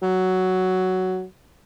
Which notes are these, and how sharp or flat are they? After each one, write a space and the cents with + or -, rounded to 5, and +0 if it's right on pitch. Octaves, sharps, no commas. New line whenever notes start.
F#3 +5